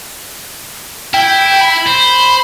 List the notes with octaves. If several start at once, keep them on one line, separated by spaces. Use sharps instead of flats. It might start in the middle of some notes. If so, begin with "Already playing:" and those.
E4 G5
B5
C5